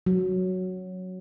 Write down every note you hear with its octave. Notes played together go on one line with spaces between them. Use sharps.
F#3